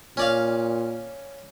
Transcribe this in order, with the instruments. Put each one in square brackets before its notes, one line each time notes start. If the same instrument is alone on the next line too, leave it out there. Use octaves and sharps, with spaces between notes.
[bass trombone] A#2 [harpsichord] C#4 D5 F5